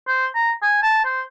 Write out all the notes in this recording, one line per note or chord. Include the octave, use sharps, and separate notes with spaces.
C5
A#5
G#5
A5
C5